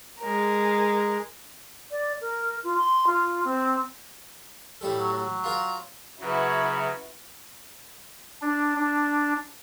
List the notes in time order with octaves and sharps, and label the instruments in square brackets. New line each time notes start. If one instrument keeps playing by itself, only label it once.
[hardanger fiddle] G#3 A#4
[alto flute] D5
A#4
F4
C6
F4
C4
[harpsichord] A2 G3 A4
[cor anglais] F#3
F#3
[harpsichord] F4 A#4 A#5
[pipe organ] C#3 F#3 [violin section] E4 F#4 B4
[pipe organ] D4
D4